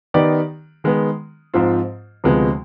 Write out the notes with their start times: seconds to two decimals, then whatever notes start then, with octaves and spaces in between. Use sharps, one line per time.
0.14 D#3 B3 D#4 G4 D5
0.84 D#3 G#3 B3
1.54 G#2 F3 C4 F4
2.24 D2 C3 F3 G#3 B3